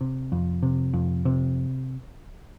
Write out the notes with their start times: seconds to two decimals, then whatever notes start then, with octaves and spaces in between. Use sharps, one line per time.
0.01 C3
0.32 F2
0.63 C3
0.93 F2
1.25 C3